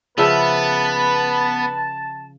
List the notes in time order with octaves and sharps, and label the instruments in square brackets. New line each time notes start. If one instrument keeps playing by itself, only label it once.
[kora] C#3 F3 E5 [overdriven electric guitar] B3 [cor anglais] B4 [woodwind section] A5